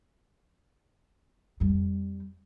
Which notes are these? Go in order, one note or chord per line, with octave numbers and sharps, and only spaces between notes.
F2 G3